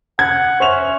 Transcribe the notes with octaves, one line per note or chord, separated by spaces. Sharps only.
F#5 G#6
C#4 C5 E5 F7